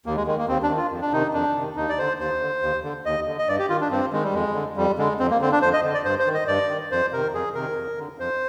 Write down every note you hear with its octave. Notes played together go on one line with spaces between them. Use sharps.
D#2 A#3
G#3
D#3 G#3
A#3
D#2 C4
D4
D#3
F4
F2
D4
C3 D#3 D#4
F2 D4
C3 D#3
D#2 D#4
D5
D3 C5
D#2 C5
D3
D#2
D3
D#2 D#5
D3
D#5
G2 D5
G4
D#3 F4
D4
G2 C4
D#3 G#3
G3
F2 G#3
D3
F2 G3
D3 G#3
F2 C4
A#3
D3 C4
D4
F2 C5
D#5
D3
D5
G2 C5
C5
D#3
D#5
G2 D5
D#3
F2 C5
C3 D#3 A#4
F2 G#4
C3 D#3 A#4
F2
D3
F2 C5